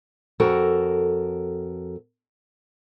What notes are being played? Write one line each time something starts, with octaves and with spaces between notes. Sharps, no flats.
F2 F#4 A4 A#4